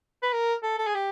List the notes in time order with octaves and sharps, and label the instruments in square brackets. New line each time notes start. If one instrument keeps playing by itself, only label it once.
[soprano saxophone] B4
A#4
A4
A4
G#4
G4